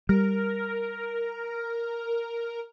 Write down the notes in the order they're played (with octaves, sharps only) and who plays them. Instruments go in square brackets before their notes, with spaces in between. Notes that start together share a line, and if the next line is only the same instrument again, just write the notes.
[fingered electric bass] G3 [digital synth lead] A#4